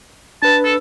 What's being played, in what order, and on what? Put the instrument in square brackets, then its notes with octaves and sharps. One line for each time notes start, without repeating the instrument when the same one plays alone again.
[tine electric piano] D4 B4 [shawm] A5
[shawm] A4